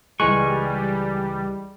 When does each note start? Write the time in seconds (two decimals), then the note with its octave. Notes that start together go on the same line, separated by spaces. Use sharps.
0.20 C#2 E3 G3 G#3 A#4 G#5 C#6 F#6